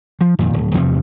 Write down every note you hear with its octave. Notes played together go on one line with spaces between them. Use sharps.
F3
F2 A#2 D#3
D1
E2 G2 C3 F3